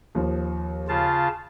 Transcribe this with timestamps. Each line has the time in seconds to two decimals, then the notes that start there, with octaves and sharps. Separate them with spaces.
0.15 D#2 F3
0.89 C#3 F4 A5